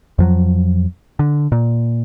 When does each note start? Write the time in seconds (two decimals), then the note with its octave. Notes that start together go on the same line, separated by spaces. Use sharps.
0.18 F2 F3 F#3
1.19 D3
1.52 A#2